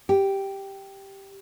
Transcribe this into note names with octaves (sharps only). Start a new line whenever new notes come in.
G4